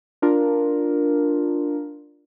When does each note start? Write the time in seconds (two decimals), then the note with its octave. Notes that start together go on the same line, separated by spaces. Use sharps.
0.22 D4 F4 A#4